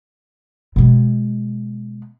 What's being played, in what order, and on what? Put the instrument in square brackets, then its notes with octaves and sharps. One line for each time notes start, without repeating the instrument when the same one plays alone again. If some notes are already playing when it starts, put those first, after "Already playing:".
[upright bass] B2 G#3